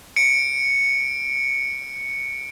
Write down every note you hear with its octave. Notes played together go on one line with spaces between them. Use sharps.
C#7 D7